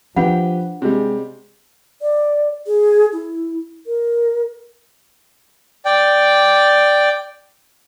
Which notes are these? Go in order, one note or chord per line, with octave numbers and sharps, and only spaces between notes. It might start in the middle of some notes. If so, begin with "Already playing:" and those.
F3 D4 G4 B4 F#5 G5 B5
C3 G3 G#3
D5
G#4
E4
A#4
D5 G5